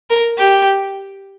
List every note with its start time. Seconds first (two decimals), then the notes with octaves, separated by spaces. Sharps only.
0.10 A#4
0.38 G4